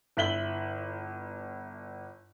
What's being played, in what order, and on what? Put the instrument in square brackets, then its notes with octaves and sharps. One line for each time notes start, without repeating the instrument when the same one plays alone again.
[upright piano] G1 E4 B6 F#7 G7